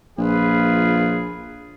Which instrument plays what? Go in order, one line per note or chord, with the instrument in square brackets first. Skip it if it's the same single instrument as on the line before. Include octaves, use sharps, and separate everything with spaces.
[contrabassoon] A#1 [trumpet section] F4 G#4 B4